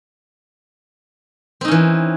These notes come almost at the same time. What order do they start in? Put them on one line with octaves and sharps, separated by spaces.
C4 D#4 C#4 E3